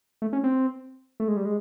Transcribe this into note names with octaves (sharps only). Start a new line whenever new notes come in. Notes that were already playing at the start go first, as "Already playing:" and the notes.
A3
C#4
C4
A3
G#3
G3
G#3